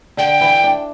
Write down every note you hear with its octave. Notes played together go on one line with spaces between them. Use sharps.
D3 G5
E3
D4